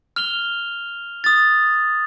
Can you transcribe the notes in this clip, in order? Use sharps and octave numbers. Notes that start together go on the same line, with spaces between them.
F6 F7 G7
D#6 A6